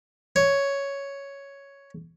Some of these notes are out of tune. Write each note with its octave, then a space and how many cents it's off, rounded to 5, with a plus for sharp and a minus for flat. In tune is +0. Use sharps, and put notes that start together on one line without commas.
C#5 +5